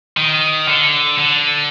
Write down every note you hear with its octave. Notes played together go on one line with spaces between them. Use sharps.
D#3
D3
D3